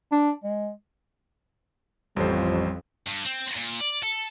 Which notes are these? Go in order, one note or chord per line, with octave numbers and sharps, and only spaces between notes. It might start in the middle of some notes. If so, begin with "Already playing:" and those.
D4
G#3
A1 F2 G3 C5
G2
C4
A#2
D5
A4